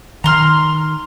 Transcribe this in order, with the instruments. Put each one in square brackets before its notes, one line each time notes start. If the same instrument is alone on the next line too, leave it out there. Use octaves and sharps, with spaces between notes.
[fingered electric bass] D#3 [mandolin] A#5 C6 F6